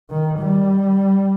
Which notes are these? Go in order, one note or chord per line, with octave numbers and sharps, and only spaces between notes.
D#3
G3